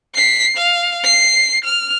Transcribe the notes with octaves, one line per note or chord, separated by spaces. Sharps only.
B6 C7
F5
C7
F6